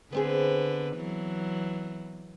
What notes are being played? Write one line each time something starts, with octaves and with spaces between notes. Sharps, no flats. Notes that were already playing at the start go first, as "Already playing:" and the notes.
D3 B3 C4 G#4 B4
E3 F#3